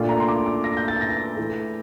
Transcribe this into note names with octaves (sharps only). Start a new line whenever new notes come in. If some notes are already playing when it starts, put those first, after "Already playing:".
Already playing: A#2 A3 D4 F4
A#5
C6
D6
D6
A#6
G6
A6
A#6
A2 E3 A3